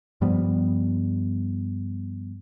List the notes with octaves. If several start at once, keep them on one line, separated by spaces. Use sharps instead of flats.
G2 F3 G3 B3